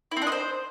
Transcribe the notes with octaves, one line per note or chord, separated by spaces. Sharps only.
E4
C4
D4
D#5
C5